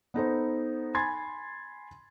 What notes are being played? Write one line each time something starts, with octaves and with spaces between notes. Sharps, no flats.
B3 D#4 A4 C5
G#5 B5 C6 G#6 A6